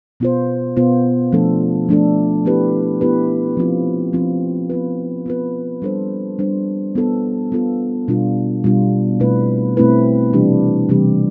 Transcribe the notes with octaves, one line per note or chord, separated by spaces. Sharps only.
B2 B3 F4 C5
B2 B3 F4 C5
F3 A3 D4 A4
F3 A3 D4 A4
B3 E4 G4 B4
B3 E4 G4 B4
F3 C4 F4
F3 C4 F4
B3 F4 B4
B3 F4 B4
G3 D4 A4 C5
G3 D4 A4 C5
B3 F4 A4
B3 F4 A4
B2 G3 D4 F4
B2 G3 D4 F4
B2 A3 C4 E4 B4
B2 A3 C4 E4 B4
C3 E3 G3 D4 G4
C3 E3 G3 D4 G4